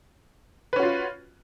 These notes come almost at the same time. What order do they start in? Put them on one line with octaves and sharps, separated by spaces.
B4 C#4 F#4 F4